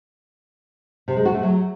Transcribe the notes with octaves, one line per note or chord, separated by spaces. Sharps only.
C3
G#3
F#4
A3
F#3